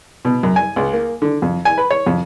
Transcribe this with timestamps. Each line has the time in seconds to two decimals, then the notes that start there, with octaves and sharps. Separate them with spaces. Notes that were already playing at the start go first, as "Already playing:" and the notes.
0.25 B2
0.43 F#2
0.56 G#5
0.76 C#2
0.93 A#3
1.22 D3
1.42 F2
1.65 G#5
1.78 B4
1.91 C#5
2.07 F2